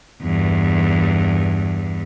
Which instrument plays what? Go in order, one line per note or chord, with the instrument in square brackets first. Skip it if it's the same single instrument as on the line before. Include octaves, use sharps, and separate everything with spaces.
[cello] E2 G2